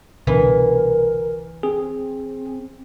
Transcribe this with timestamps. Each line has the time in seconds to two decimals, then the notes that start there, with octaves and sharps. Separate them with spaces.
0.27 C2 B2 D3 E3 A#4
1.63 C4 G#4